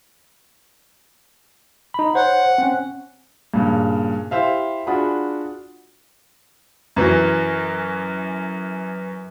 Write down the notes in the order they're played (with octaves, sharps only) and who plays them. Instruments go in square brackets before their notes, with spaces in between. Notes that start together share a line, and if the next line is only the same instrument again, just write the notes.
[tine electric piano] D#4 B5
[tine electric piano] C5 C#5 [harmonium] F#5
[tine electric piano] C4 C#4
[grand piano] G2 A#2 C#3
E4 G4 C5 E5 F5
D4 F4 F#4 G#4 F#5 B5
F#2 E3 F#3